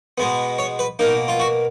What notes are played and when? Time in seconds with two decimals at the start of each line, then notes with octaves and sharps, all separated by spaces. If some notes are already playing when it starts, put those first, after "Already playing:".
0.18 B2 G#3 B3
0.58 C#5
0.79 B4
0.99 B2 A#3 D#4
1.28 F4
1.40 F#4